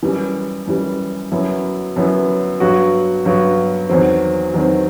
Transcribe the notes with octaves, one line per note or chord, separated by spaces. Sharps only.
F#2 E3 G3
F#2 E3 G3
F#2 F#3 B3 E4
F#2 F#3 B3 E4
G2 F#3 B3 F#4
G2 F#3 B3 F#4
E2 D#3 F#3 C4
E2 D#3 F#3 C4